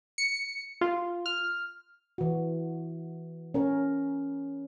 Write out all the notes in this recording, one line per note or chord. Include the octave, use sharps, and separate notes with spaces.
C#7
F4
F6
E3 F#4
C#4 A#4 C#5